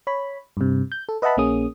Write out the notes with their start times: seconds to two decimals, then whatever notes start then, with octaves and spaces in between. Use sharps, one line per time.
0.07 C#5 B5
0.57 G2 C3
0.92 G6
1.09 A4
1.22 B4 D#5 E5 F#5 A5 B5
1.37 A#1 A#3 C#4 G#4 D#6